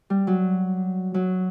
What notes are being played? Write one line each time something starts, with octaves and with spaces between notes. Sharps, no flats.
G3
F#3
F#3